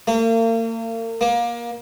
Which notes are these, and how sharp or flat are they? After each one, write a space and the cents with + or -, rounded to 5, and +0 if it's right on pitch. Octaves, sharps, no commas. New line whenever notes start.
A#3 -40
A#3 +25